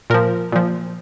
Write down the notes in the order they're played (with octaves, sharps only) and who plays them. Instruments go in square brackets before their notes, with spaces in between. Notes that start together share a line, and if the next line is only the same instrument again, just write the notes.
[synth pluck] A#2 F3 A#4
A#2 F3